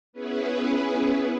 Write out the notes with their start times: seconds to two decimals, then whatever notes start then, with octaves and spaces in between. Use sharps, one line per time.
0.13 B3 C#4 E4 G#4 B4